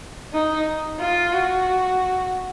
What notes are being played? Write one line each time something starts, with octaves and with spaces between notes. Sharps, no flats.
D#4
F4
F#4